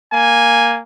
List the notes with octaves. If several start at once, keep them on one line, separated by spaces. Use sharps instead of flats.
A#3 G#5